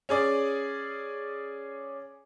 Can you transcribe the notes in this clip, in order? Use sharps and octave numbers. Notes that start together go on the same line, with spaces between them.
C#4 G#4 D5